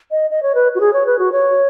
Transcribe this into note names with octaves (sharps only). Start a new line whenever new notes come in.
D#5
D#5
C#5
B4
F#4
G#4
C#5
B4
F#4
C#5